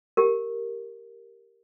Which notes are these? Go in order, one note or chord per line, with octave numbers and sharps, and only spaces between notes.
G4 A#4